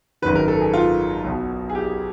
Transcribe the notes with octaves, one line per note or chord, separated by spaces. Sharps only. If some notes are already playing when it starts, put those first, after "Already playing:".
G#1 F#2 D#3 B4
A#4
A4
G#4
F4
B1 B2
G#4
G4